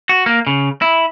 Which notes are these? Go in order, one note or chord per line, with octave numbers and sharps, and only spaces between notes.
F#4
A#3
C#3
E4